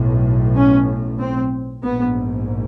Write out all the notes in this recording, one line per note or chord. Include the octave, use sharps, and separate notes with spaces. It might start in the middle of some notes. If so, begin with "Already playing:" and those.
Already playing: B1 A2
C#4
C4
A#1 G#2 B3